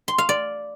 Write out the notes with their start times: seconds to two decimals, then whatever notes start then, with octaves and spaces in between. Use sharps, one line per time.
0.08 C6
0.18 F5
0.29 D5